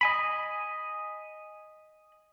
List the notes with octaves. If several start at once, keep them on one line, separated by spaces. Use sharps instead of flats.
D#5 G#5 B5